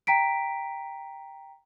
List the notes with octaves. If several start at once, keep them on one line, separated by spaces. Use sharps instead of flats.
G5 A#5 B6 D7